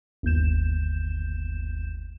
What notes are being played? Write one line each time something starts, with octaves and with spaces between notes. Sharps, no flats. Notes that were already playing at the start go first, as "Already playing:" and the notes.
G1 D#2 G6 E7